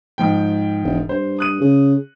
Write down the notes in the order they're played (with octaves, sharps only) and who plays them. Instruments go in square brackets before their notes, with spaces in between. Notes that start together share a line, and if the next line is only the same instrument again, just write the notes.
[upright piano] G#2 F3 G5
[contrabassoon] E1
[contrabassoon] G2 [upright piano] C5
[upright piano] D#6 F#6 D#7
[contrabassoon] C#3